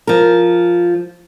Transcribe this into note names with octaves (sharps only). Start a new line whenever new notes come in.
F3 A#4